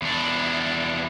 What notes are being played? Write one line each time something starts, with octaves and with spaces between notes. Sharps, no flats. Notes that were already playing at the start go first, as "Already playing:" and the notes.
E2 D4